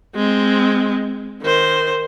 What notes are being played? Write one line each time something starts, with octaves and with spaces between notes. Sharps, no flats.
G#3 C4
D#3 C5